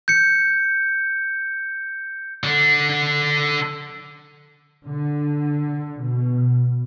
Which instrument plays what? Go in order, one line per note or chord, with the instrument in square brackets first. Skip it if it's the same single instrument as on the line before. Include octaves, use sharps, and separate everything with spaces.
[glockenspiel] G6 C#7
[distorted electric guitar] D3 D4
[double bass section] D3
B2